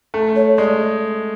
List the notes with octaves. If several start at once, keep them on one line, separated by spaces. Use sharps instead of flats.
A3
C#5
G#3 D5